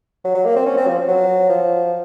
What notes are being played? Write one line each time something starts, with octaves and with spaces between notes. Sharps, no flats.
F#3
F#3
A#3
C4
C#4
C4
F3
F#3
F3